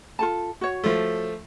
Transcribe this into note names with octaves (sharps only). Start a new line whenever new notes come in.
F4 A4 A5
F#4 C#5
F3 A3